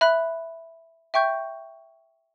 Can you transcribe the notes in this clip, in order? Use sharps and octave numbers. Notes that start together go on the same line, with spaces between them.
E5 B5 F#6
E5 G5 C#6 G6